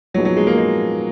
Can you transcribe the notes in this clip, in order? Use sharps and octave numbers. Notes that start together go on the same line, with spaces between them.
A#2 F3 F#3 B3 D#4 G#4
F#3
G#3
A#3
G#3